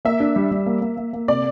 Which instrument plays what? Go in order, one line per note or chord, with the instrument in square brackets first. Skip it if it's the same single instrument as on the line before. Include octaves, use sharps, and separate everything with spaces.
[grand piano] A#3 [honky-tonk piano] E5
[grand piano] D4
G3
G3
A#3
A#3
A#3
A#3
[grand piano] C3 [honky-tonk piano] D5